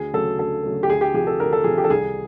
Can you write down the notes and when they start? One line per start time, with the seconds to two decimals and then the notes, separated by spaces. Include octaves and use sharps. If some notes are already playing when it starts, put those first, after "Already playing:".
Already playing: D2 G#4
0.13 C#3 F#3 A3 A4
0.38 D2 A4
0.63 C#3 F#3 A3
0.83 G4
0.88 D2 G#4
1.01 G4
1.14 C3 F3 G#4
1.27 A4
1.40 D2 A#4
1.53 A4
1.64 C3 F3 G#4
1.78 G4
1.84 A4
1.90 C2 G#4